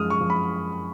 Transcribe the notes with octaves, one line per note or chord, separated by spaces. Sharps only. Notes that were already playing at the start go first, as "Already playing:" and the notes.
Already playing: F#2 F3 G#3 D#6 F6
C#6
F3
B5